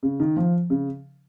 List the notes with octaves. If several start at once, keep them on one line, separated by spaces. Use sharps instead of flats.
C#3
D#3
F3
C#3